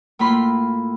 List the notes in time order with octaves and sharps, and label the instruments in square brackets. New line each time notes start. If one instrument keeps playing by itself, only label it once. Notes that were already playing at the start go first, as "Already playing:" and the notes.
[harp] A2 A#3 F4 B5 C6